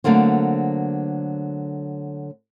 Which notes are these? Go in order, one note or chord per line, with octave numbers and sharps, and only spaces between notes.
D3 F#3 A3 A#3 C4